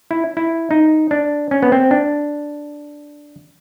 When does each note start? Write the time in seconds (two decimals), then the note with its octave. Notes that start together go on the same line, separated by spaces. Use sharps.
0.11 E4
0.37 E4
0.71 D#4
1.11 D4
1.51 C#4
1.62 B3
1.72 C4
1.91 D4